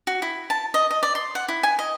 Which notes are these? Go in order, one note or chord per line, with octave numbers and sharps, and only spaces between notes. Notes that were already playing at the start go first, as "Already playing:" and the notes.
F#4
E4
A5
D#5
D#5
D5
C6
F#5
E4
G#5
D#5